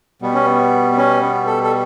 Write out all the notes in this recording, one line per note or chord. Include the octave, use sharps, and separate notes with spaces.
B2 G3 B3
C#4
B3
B3
C#4
B3
A4
A4